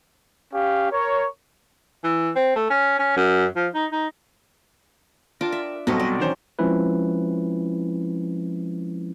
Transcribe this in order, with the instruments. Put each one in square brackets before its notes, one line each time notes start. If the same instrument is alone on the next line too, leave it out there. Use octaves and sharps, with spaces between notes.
[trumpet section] C#4 G4 F5
A#4 C#5
[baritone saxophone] E3
C4
A3
C#4
C#4
F#2
F3
D#4
D#4
[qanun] D4 F4 D6 [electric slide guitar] A#4 G5 A5
[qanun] E5
[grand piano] B1 B2 [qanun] F#3 C4 D#5 [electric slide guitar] G3 B3 A4
[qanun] D5
[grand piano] D#3 C#4 C5 [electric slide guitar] E3 F#5
[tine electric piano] F3 G#3 C4 C#4 E4 B4